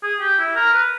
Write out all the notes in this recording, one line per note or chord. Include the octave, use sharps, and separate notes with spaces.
G#4
G4
E4
A#4
B4